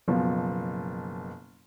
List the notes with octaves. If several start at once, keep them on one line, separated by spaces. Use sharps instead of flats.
F#1 B2 F3